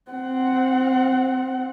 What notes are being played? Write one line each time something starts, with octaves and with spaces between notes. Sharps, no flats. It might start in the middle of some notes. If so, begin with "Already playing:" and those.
C4 F#5